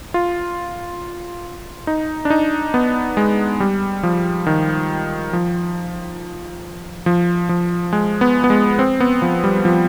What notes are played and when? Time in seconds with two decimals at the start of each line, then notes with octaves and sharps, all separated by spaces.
0.14 F4
1.87 D#4
2.25 D4
2.30 D#4
2.74 B3
3.17 G#3
3.60 G3
4.03 F3
4.47 D#3
5.33 F3
7.06 F3
7.49 F3
7.93 G#3
8.21 B3
8.44 B3
8.50 G#3
8.79 C4
9.00 B3
9.22 F3
9.44 G3
9.65 F3